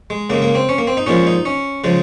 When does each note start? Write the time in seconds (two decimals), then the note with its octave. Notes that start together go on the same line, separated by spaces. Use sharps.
0.10 G#3
0.30 C#3 A#3
0.33 G#3
0.42 A#3
0.55 C4
0.69 C#4
0.78 A#3
0.87 C4
0.97 D#4
1.06 A#2 F3 G#3 C#4
1.27 D#4
1.45 C#4
1.84 C#3 F3 G#3